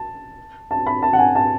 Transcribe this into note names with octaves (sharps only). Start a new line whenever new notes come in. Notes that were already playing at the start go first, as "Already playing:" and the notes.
Already playing: A5
A5
B5
A5
F#5
G#5
A5